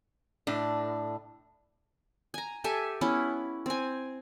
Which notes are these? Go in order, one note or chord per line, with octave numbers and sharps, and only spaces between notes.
A2 D4
G#5 A#5
G4 A4 E5 G#5
B3 C#4 E4
C4 G#5